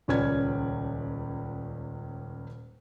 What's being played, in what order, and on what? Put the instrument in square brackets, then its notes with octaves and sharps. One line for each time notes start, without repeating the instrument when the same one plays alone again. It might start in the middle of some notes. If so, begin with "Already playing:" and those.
[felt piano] D#1 C#2 C#4 B4 D5 G#6